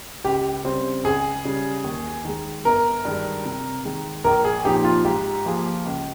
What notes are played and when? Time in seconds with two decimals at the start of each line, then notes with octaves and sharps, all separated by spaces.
0.24 C#2 G4
0.64 C#3 G3 C4
1.04 C#2 G#4
1.45 C#3 G3
1.84 D#2
2.25 D#3 G#3
2.65 G1 A#4
3.05 G2 D#3 G#3
3.45 C3
3.85 D#3 G#3
4.24 A#1 A#4
4.45 G#4
4.65 A#2 F3 C4 D#4 G4
4.85 F4
5.05 G#2 G4
5.45 F3 A#3 F4 G#4
5.85 C#2